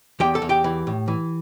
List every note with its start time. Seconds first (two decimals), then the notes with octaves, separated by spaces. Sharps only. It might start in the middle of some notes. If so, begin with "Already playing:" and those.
0.20 E2 G4 G5
0.35 A4 A5
0.42 E2
0.49 G4 G5
0.64 E3
0.87 A2
1.08 E3